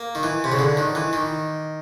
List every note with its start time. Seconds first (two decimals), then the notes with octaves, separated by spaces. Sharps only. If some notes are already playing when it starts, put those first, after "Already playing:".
Already playing: A#3
0.15 D#3
0.23 E3
0.44 C3
0.52 C#3
0.59 D3
0.77 D#3
0.95 E3
1.13 D#3